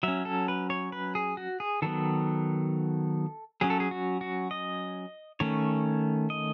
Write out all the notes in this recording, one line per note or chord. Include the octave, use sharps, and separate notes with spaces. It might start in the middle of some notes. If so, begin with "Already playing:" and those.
F#3 C#4 E5
A4
B4
C#5
B4
G#4
F#4
G#4
D#3 F#3 B3 A4
F#3 C#4 G#4
A4
G#4
F#4
F#4
D#5
D#3 A3 C#4 C#5
D#5